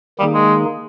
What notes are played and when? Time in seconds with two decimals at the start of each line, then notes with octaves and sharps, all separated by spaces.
0.19 D#3 G3 A#3 D#4 G#4
0.34 G#3